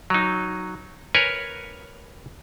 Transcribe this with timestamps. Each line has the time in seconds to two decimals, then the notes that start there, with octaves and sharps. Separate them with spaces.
0.10 F#3 D#4
1.15 A#4 B4 C#5 G#5